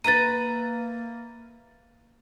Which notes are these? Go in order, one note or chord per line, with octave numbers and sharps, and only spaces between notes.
A#3 B4 E5 A#5 A6 D#7